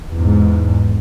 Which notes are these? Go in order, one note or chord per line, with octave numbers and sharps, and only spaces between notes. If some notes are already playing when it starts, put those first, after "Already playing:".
E2 G#2